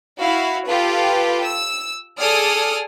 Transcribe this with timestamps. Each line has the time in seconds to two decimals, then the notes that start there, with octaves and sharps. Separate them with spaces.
0.19 E4 F#4 F5
0.68 F4 G4 A4 B4
1.48 E6
2.19 G#4 A4 D5 D#6 F6